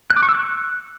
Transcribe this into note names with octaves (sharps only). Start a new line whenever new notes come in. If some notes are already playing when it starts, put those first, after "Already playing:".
F#6
D6
C#6
E6
F#6